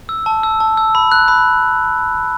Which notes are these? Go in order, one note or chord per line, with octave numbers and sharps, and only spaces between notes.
E6
A5
E6
A5
E6
B5
F#6
B5